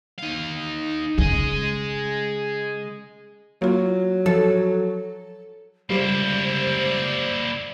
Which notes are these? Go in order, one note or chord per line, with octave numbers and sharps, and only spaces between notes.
D#4 F5
C#3 G#4 D#5
F#3 A#3 F4
F3 A4
C#2 G3 A#3 E4 C5 D5